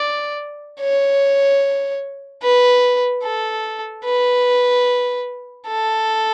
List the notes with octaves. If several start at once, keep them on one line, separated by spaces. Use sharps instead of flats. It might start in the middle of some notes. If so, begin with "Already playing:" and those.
Already playing: D5
C#5
B4
A4
B4
A4